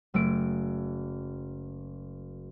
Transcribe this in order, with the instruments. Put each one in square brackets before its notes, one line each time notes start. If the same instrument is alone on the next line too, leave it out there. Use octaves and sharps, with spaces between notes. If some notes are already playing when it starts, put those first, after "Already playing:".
[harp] F#1 A3 D7